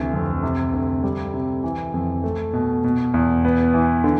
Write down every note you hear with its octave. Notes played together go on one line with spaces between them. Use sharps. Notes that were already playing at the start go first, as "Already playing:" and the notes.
Already playing: D2 C3 E3
F2
C3
D2
G3
C3
E3
F2
A3
B2
B2
E2
B3
E3
D3